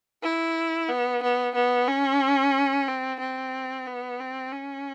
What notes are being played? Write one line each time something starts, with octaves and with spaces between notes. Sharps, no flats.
E4
B3
B3
B3
C#4
C4
C4
B3
C4
C#4